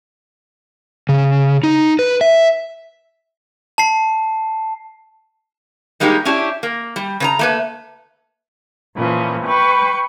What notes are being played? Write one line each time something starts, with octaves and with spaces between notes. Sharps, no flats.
C#3
D#4
B4
E5
A5 C7
G3 G#3 A#3 D#4 G4
C#4 D4 E4 G4
A#3
G3
C#3 C5 A#5
A3 A#3 B4
A#2 E3 F3 C#4
B4 G5 B5 C#6